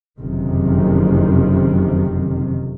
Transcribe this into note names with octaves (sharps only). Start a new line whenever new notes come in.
F#1 F2 C3 D#3